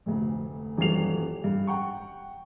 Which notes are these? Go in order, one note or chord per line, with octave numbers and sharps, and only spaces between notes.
F1 D2
D#1 F#2 E3 G3 C7 F7
G2
F#5 G5 C#6